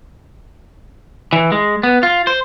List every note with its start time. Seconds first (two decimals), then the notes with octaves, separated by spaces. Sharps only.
1.33 E3
1.52 G#3
1.83 B3
2.03 F4
2.27 C5